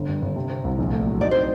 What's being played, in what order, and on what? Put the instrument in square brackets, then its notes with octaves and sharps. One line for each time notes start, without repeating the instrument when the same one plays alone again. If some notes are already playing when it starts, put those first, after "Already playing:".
Already playing: [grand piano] G1
G2
G1
C3
C4
C2
A#1
A3
F#3
[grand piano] D#4 [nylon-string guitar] D5
[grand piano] C4 [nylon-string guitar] C5